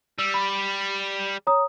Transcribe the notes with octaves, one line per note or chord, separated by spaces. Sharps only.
G3 E6
B5
C#5 A#5 D#6